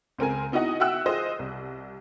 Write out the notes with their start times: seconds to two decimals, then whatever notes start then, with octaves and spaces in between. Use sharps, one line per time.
0.18 C#2 C4 A#4 G#5
0.52 B3 D#4 E4 F#4 D#5 F#5
0.80 F#4 E5 F#5 G5 E6 F#6
1.06 F4 G#4 C5 D#5
1.39 C2